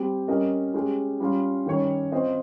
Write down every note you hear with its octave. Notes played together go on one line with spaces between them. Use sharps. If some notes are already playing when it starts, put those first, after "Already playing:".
Already playing: G3 C4 G4
G3 C#4 G4 A#4 D#5
G#3 C#4 G4
G3 C#4 F4
D#3 G3 C#4 G4 C#5
C4 F4 C5 D#5